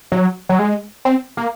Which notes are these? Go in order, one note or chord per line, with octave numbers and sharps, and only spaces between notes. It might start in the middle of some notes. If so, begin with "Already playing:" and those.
F#3
F#3
G#3
C4
A#3